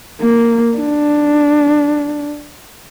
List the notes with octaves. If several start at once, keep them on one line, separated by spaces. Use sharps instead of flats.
A#3
D4